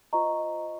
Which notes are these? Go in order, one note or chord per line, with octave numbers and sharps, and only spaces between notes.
F4 C5 D#5 A#5 C#6